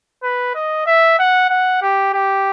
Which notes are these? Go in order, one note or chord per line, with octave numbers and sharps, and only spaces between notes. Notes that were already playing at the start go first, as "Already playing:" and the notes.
B4
D#5
E5
F#5
F#5
G4
G4